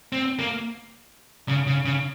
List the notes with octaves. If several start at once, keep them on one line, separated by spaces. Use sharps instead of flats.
C4
A#3
C#3
C#3
C#3